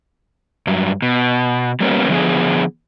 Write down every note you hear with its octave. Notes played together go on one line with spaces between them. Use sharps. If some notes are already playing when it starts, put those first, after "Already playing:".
G2 F#3
B2
G3 A#3 B3 C#4
D3 F3 B3 G#4